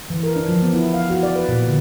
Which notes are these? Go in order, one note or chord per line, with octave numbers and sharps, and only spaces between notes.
E3
A#4
D4
F3
B3
E4
F5
F#4
D5
B4
A#2
D3